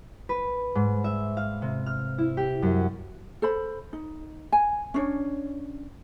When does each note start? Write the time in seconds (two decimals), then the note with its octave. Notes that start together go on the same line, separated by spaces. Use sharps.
0.29 B4
0.75 G#2
1.04 E5
1.37 F5
1.62 C3
1.86 F6
2.18 E4
2.37 G4
2.62 F#2
3.42 A4 C5 B5
3.93 D#4
4.52 G#5
4.94 C#4 D4 C#5